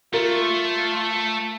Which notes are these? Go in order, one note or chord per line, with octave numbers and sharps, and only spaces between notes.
A3 F4 A#4